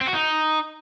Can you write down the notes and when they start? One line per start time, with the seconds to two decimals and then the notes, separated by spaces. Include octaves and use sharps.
0.01 C4
0.08 F#4
0.14 D#4